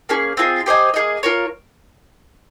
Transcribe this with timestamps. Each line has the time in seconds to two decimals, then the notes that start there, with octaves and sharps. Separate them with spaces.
0.09 A#3 C#4 G#4
0.37 C4 F4 G#4 D#5
0.66 G4 C5 D#5 G#5
0.94 A#3 D#4 G#4 D#5
1.23 F4 A#4 C#5